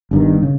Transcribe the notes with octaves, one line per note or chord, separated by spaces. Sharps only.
G1 G2 D#3
C#3